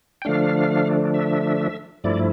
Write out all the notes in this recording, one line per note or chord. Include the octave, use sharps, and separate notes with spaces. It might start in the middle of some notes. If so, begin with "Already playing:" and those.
G5
D3 F3 A3 D4 F5
E5
G2 F3 A3 E4 D5